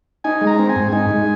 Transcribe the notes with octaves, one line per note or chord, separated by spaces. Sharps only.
D#4 G#5
G#3
A#5
C4
G#5
G#2
D#4 G#5
G#3